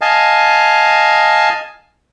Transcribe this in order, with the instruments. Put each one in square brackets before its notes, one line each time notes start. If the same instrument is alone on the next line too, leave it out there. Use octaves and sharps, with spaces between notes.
[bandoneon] D#5 F5 G#5 A5